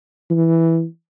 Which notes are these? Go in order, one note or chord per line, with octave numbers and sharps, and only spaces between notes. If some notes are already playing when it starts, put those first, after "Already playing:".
E3